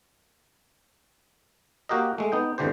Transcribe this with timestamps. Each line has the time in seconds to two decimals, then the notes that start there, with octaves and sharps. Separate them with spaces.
1.89 A#3 F#4 G4 A#4 D#5
2.18 G#3 A3
2.32 B3 D#4 G5
2.58 G#1 E2 D3 E3 G4 C5